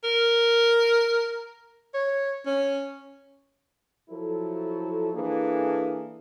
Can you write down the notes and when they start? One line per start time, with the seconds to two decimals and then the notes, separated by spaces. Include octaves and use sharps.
0.04 A#4
1.94 C#5
2.46 C#4
4.10 F3 F#3 E4 A4
5.14 E3 A#3 D4 G#4 A4